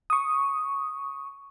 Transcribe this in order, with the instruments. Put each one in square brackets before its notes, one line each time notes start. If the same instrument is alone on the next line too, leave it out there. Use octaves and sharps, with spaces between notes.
[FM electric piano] C#6 D#6